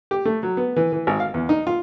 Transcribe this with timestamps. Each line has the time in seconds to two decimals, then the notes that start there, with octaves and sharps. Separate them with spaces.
0.11 G4
0.25 A3
0.43 F#3
0.57 B3
0.76 E3
0.93 E3
1.07 G#1
1.20 F5
1.34 E2
1.49 D#4
1.67 F4